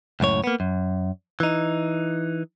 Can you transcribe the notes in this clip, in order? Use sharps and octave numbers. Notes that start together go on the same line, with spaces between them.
C#2 F#2 A2 C#5
A#3 B3
F#2
E3 D#4